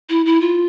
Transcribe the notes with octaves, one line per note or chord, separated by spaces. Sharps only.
E4
E4
F4